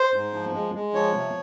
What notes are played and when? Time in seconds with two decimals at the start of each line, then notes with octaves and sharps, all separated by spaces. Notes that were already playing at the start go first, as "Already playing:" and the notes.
Already playing: C5
0.14 G#2
0.34 F3
0.54 G#3
0.74 G#3
0.94 F3 C#5
1.14 C3